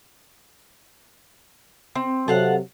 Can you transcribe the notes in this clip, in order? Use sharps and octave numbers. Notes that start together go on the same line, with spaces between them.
C4
C3 F#3 A4 F5 F#5